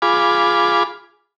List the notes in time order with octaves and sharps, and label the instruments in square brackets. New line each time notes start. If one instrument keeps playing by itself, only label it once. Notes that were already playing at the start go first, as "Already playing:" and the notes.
[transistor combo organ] F4 G#4 B5 D6